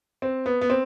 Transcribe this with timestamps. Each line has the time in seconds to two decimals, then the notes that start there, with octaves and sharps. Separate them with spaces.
0.22 C4
0.46 B3
0.61 B3
0.70 C4